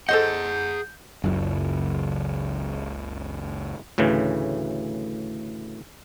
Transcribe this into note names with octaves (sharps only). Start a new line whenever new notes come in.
G#4 A4 C5 D#5 F#5 G6
F#1 C#2 F#2
D2 A2 C#3 E3